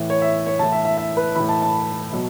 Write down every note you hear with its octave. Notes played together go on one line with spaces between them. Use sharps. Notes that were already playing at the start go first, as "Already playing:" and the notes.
Already playing: A2 E3
C#5
E5
C#5
A2 E3 A5
E5
E5
E5
B4
A2 E3 B5
A5
A5
B2 F#3